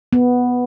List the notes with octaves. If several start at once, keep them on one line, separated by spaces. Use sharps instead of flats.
B3